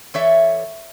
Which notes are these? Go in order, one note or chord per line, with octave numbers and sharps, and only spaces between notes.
E3 A4 C#5 D5 E5